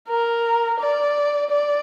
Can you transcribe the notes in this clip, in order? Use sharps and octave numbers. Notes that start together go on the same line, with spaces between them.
A#4
D5
D5